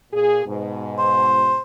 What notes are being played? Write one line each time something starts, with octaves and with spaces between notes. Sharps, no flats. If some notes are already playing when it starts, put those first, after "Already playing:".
A#2 G#4
G#2 B2
C5